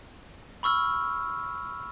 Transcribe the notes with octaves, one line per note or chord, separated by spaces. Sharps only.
B5 C#6 E6 F6